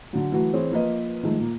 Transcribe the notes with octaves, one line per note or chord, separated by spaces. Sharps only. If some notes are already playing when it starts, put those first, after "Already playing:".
D3 F#3
E3 F#3 A3 F#4
E3 C4 G#4 C5 C#5
F3 A#3 F4 B4 D#5
D#3 F3 G#3 A3
A#2 A#3